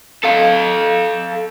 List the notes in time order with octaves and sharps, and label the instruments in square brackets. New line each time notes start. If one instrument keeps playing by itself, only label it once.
[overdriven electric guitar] A4 F5